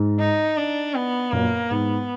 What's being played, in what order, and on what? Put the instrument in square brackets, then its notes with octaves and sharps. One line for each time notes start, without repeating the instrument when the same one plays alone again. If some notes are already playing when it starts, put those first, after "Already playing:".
Already playing: [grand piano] G#2
[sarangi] D#4
D4
B3
[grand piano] F#2 A#2 [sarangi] A#3
[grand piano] G#2 [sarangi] B3